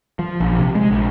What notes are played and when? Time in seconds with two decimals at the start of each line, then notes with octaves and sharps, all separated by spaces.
0.19 F3
0.40 A#1
0.59 C3
0.75 G#3
0.91 A#1